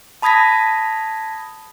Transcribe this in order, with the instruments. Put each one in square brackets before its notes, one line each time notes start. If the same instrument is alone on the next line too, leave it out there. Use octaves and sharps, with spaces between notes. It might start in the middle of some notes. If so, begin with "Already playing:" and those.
[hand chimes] A5 B5 D#6 G#6 A#6 B6